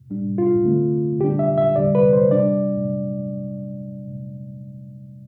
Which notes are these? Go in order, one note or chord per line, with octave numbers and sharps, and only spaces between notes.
A2 G3 D4
F4
D3 A3 C4
D3 G3 D4 G4
E5
E5
E2 D3 G3 D5
B4
C5
C3 G3 D4 D5